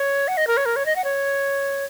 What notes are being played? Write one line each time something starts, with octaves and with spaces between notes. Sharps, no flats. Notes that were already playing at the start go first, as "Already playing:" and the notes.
Already playing: C#5
F#5
D#5
A#4
C#5
A#4
C#5
D#5
F#5
C#5